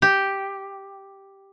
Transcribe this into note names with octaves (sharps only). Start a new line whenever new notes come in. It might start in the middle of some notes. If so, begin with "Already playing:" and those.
G4